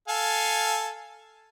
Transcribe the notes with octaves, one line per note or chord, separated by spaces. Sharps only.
A4 F5 G#5